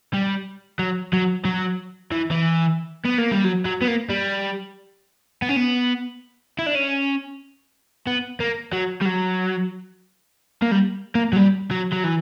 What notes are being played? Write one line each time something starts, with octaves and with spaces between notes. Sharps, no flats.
G3
F#3
F#3
F#3
E3
E3
B3
A#3
G3
F#3
F#3
B3
A#3
G3
B3
C#4
B3
E4
D4
C#4
B3
A#3
F#3
G3
F#3
A#3
G3
A#3
F#3
G3
F#3
F#3
E3